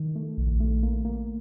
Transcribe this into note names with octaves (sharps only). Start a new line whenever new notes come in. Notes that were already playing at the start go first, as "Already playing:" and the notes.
Already playing: D#3
A3
A#1
A3
A#3
A#3